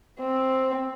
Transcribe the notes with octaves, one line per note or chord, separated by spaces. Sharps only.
C4